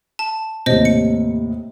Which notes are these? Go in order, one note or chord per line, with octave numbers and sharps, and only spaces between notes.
A5
D#2 A2 C3 C5 D#5
C#7